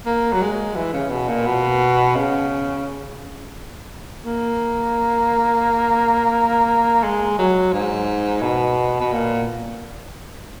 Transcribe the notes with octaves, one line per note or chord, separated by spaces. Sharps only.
A#3
F#3
G#3
E3
C#3
B2
A#2
B2
C#3
A#3
G#3
F#3
G#2
B2
B2
A#2